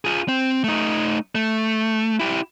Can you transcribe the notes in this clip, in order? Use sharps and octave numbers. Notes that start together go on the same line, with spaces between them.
F4 G#4
C4
A3 D#4
A3
E4 G4